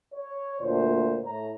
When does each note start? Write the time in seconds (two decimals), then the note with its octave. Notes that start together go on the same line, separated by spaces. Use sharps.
0.14 C#5
0.61 D2 A#2 C5
1.24 A2 C#5 A#5